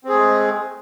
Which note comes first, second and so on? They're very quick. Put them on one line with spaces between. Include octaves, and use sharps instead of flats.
C4 G#4 A3 G#3